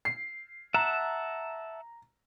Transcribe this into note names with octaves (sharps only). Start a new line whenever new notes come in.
C7
E5 F#5 A5 A#5